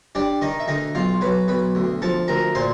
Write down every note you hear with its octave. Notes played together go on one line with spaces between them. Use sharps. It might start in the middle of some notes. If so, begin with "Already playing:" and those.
G3 D4 D5
D#3 D#4 D#5
E5
D2 D#4 D#5
B1 F4 F5
F#3 B4 B5
B1 B4 B5
D2
F3 A4 A5
D2 A#4 A#5
A#2 C5 C6